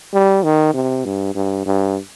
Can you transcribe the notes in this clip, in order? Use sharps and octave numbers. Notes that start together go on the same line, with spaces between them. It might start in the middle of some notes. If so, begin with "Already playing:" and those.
G3
D#3
C3
G2
G2
G2